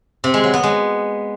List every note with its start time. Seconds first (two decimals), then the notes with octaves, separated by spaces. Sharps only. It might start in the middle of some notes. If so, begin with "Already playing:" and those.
0.24 C3
0.34 G#3
0.44 F#3
0.54 B3
0.63 G#3